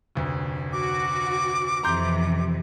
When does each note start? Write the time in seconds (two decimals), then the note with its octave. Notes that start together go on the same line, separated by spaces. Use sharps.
0.16 F1 D2
0.73 F#4 D6
1.83 F2 C3 E3 A#5 C6 G6